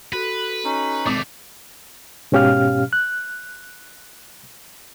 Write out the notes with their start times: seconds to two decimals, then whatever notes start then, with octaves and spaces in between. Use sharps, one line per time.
0.13 F#4 A4 B4 B6
0.65 C#4 D#4
1.06 G#1 B2 A3 D6
2.32 G#2 B2 C#4 G4 F5 F6
2.93 F#6